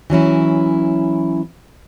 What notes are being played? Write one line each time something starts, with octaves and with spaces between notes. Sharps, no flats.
E3 F#3 C#4 E4